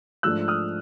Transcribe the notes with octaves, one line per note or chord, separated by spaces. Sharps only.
G#2 F3 A3 D4 E6 F#6
D#6 F6